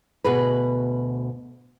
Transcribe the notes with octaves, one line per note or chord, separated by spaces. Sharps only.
D2 B2 F#4 G#4 B4